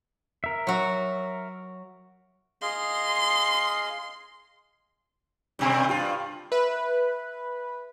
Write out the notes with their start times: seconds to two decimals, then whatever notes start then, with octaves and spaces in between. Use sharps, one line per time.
0.44 A#4 E5
0.67 F#3 F#4
2.62 G#4 D#5 F5 C6
5.59 G2 B2 C4
5.89 G2 F4
6.52 B4 E5